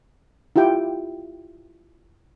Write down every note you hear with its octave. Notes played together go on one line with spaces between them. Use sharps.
E4 F4 G4 G5